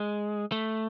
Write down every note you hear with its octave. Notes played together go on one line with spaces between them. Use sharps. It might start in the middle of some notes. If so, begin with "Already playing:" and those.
Already playing: G#3
A3